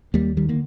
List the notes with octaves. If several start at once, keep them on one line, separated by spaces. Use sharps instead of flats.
D#2 G3 A#3
D#3 G3
D3 A#3